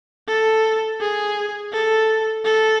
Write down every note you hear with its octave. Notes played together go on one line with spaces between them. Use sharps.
A4
G#4
A4
A4